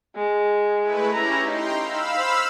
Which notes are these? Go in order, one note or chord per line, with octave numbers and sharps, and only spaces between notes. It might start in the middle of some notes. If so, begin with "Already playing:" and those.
G#3
A3 E4 B4
C#4 E4 G4 A#5
D#4 G5 A#5 C6
F5 B5 E6
C5